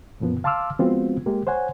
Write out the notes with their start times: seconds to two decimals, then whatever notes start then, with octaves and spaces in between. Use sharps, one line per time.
0.20 C2 F#2 A#2 F3 B3
0.44 F5 A5 C6 D6 E6 F6
0.79 F3 G#3 B3 C4 F4 F#4
1.26 G#3 A#3 G4
1.47 C5 C#5 F#5 G#5